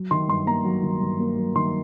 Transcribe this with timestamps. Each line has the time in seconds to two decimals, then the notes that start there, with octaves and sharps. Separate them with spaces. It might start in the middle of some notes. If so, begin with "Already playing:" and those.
Already playing: F#3
0.11 D#3 C6
0.28 G2 C6
0.47 A#3 A#5
0.65 F#3
0.83 D#3
1.01 G2
1.20 A#3
1.37 F#3
1.55 D#3 C6